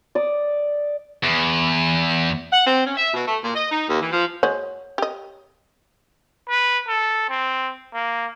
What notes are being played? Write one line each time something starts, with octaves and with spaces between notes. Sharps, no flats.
D5 D#6
E2
F#5
C4
C#4
E5
B2
A3
A#2
D#5
D#4
D#2
E3
F3
G#3 F#4 C#5
G4 D#5
B4
A4
C4
A#3